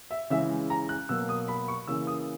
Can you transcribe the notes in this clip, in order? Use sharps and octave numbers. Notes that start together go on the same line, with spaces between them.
E5
C#3 E3 G#3 E5
A#5
F#6
B2 F#3 A#3 E6
D#6
B5
C#6
C#3 E3 A#3 E6
D#6